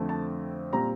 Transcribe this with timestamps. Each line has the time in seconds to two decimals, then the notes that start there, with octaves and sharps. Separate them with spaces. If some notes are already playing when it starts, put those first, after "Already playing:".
Already playing: F2 D3 A3 C4
0.09 A5
0.73 A#2 G3 C4 A#5